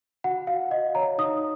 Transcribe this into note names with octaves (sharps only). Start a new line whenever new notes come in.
F#4 F#5
F#4 F5
F#4 D#5
C#5 A#5
D#4 D#6